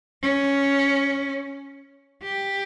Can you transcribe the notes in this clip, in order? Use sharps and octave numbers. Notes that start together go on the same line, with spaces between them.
C#4
G4